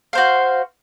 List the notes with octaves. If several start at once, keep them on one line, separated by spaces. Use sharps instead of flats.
F#4 C5 F5